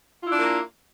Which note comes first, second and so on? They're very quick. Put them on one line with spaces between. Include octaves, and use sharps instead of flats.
F4 E4 D4 A#3